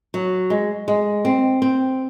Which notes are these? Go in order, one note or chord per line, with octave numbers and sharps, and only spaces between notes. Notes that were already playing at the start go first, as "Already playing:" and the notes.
F#3
G#3
G#3
C4
C4